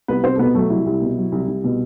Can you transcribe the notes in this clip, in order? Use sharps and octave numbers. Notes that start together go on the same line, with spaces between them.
C2 B3 B4
C2 C4 C5
A4
B2 B3 B4
F#3 A3 A4
C2 E4
C2
B2
F#3
C2
C2
B2